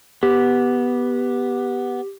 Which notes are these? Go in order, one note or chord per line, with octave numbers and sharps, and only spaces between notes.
B3 G4